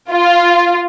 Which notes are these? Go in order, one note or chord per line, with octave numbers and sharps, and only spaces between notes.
F4